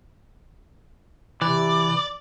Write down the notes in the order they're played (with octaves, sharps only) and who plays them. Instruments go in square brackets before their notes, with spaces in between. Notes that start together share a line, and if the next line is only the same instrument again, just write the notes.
[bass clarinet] C3 [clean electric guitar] E3 [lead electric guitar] D5